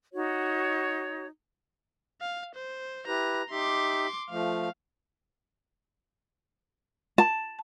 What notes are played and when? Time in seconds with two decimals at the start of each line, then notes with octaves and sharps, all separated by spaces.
0.13 D#4 F#4 C#5
2.21 F5
2.55 C5
3.07 E4 G4 B4 A#5
3.51 D#4 G4 E5 C6 D6
4.30 F3 A3 F5
7.18 A5